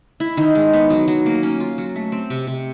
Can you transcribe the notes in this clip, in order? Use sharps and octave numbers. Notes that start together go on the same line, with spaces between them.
E4
D#3
G#3
B3
F#3
F#3
A#3
C#4
F4
F#3
A3
C4
C3
C3